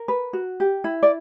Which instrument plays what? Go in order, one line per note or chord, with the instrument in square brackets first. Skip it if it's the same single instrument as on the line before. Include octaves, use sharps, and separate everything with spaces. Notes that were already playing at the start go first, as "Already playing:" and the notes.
Already playing: [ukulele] A#4
B4
F#4
G4
E4
D5